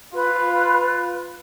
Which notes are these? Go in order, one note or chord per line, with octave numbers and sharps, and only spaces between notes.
F4 B4